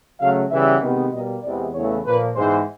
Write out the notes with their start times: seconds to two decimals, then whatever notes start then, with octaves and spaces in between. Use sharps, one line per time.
0.20 C#3 F#3 A3 F5
0.51 C#3 E3 G3 B3 E5
0.81 C3 D#3 G#3 B3
1.12 B2 G3 A#3 D#5
1.43 E2 C3 E3 G#3 B3 D5
1.74 E2 C#3 E3 A3 C#5
2.05 A#2 F3 A#3 B4
2.35 G#2 E3 G#3 B3 C5